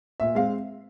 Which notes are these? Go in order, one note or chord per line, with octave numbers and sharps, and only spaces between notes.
A#2 E5
G#3 C4 F5